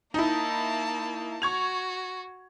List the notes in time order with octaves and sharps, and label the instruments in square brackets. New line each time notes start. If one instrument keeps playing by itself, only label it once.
[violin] A#3 A5 [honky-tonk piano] D#4 E4
[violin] F#4 [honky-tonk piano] C#6 G#6 F7